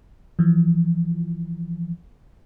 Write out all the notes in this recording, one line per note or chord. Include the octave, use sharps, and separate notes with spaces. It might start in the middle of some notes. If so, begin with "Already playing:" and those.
E3 F3